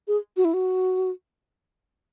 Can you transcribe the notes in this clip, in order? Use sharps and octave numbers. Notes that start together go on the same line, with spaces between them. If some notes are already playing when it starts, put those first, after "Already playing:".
G#4
F#4
E4
F#4